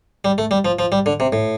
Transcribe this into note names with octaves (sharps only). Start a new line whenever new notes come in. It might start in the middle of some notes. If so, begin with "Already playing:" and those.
G3
A3
G3
F3
F3
G3
D3
C3
A2